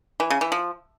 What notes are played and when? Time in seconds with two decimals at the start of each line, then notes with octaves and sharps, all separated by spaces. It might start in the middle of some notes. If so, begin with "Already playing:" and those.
0.20 E3
0.30 C#3
0.41 E3
0.52 F3